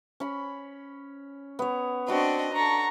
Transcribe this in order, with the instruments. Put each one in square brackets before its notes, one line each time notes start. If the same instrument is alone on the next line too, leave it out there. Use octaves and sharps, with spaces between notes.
[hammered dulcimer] C#4 B5
B3 C#5
[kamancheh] C4 [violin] D4 D#5 [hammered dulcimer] F#4 C6
[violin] D4 A4 [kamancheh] A#5 C#6